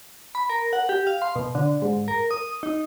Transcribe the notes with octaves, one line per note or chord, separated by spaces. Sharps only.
B5
A#4
F#5
G4
F5
C6
B2
D3
G#2
A#4
D#6
D#4